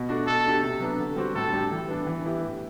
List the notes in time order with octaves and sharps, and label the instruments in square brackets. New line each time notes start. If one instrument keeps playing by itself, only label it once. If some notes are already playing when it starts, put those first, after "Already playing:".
Already playing: [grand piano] B2
A3 D4 F#4
[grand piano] B2 [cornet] A4
[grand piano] A3 D4 G4
C3
F#3 B3 D4
D3
G3 C4 F#4
[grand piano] A2 [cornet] A4
[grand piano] G3 D4 G4
E3
B3 D4
E3
B3 E4 G4
A2